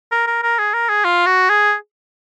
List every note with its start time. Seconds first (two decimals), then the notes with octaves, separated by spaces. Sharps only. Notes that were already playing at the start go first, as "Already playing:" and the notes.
0.12 A#4
0.27 A#4
0.43 A#4
0.59 G#4
0.74 A#4
0.89 G#4
1.04 F4
1.26 F#4
1.50 G#4